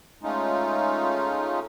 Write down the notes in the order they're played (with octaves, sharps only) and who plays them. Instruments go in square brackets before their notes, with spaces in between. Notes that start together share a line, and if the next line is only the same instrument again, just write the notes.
[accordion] G#3 A3 C#4 D#4 F4